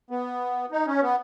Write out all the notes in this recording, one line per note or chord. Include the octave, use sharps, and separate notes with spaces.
B3
D#4
C#4
B3